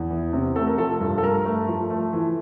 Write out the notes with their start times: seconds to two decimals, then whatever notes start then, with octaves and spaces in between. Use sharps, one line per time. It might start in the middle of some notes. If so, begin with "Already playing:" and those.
Already playing: E2
0.10 E3
0.33 C3
0.56 A3 A4
0.67 A#4
0.78 F3 A4
1.00 G2
1.18 A4
1.23 G2 A#4
1.45 A3
1.69 F3
1.90 A3
2.13 E3